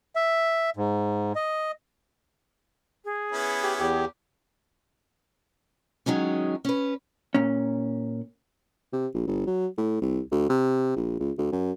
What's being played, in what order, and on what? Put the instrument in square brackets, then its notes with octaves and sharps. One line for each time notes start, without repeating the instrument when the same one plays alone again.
[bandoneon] E5
G#2
D#5
[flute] G#4
[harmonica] B3 C#4 E4
[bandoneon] G4
E2 G4
[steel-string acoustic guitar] D#3 F#3 G#3 C#4
C#4 B4
[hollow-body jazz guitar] A#2 C#4
[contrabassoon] C3
A#1
G1
F#3
A2
C2
D2
C3
A#1
C#2
D2
F#2